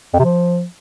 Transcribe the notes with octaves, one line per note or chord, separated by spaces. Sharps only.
F2
C3
F3